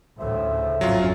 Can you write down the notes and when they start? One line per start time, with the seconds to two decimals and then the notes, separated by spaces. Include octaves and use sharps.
0.19 D2 A2 C#3 C5 E5
0.81 G#1 F2 F#3 C#4 F4